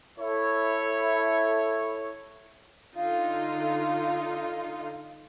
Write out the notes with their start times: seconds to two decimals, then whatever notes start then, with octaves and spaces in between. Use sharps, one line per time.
0.19 E4 A4 C#5
2.96 D3 D#4 F4 F5